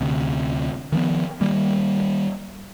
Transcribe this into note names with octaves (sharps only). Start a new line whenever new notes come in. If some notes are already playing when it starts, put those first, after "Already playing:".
D2 C3
D#3 F3 A#3 B3
D#3 G3 A#3